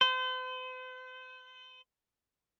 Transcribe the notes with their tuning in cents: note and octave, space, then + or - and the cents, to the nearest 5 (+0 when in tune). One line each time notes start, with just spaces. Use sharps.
C5 -40